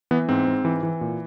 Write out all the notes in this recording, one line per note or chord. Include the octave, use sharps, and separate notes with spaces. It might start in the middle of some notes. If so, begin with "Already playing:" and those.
E3 B3
G#2 C4
G#2
E3
E3
A#2